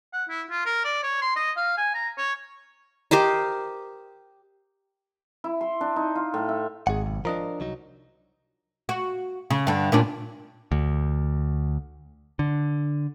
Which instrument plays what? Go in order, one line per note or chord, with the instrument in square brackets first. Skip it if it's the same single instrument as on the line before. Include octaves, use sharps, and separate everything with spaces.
[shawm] F#5
E4
F4
A#4
D5
C#5
C6
D#5
F5
G#5
A#5
C#5
[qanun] G4 A#4 C5 D#5
[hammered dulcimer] E4
C6
D4
D#4
F4
A2
E5
[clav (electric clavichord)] G#1 [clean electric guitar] G#4 F#5
[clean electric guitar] B1
[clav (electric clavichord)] F3 D#5 [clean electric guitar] D4 A#4
[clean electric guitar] C2 F#3 D#4
[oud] F#4
C#3
G2 D3
A#2 C#4 D4
[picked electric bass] D2
D3